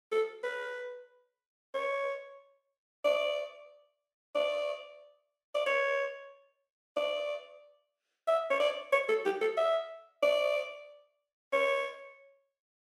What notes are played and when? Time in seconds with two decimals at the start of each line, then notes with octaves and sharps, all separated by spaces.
0.12 A4
0.43 B4
1.74 C#5
3.05 D5
4.35 D5
5.55 D5
5.66 C#5
6.97 D5
8.27 E5
8.50 C#5
8.60 D5
8.92 C#5
9.08 A4
9.25 G4
9.41 A4
9.57 E5
10.23 D5
11.53 C#5